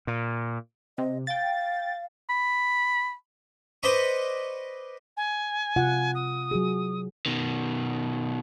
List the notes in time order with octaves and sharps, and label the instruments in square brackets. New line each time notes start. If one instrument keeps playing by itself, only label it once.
[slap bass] A#2
[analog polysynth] C3 [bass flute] D#5
[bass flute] F5 [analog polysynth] G5 A6
[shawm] B5
[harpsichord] B4 C5 D5 D#5 B5 C#6
[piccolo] G#5
[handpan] C3 F4 F#5
[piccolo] D#6
[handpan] F#3 F#4 G#4
[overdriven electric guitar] B2 D#3